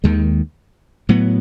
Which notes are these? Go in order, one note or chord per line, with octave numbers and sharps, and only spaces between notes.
D#2 D#3 G#3
A2 F#3 B3